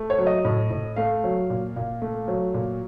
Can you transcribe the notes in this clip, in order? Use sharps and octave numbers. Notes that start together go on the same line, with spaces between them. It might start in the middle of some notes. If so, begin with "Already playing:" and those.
Already playing: A3
C#5
F#3
D#5
A2
A2
A3 F5
F#3
A#2
A#2
A3
F#3
A#2